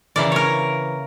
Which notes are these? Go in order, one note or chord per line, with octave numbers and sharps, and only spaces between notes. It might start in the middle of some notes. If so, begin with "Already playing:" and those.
C#3 E3 A#3 D5
A#4 C#5